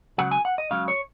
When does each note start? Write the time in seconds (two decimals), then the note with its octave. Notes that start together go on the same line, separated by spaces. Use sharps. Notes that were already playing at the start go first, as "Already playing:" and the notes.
0.18 C#2 C#3 F#3 F#5
0.31 G#5
0.45 F#5
0.58 D#5
0.71 C#2 C#3 F#3 F5
0.88 C#5